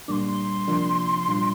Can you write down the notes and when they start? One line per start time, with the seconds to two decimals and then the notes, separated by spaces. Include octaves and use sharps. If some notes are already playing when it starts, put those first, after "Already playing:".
0.08 A#2 G3 A#3 D4 C6 D6
0.68 C3 F3 A#3 D4 F4
1.27 A#2 G3 D4 F4